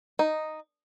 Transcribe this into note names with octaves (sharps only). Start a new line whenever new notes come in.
D#4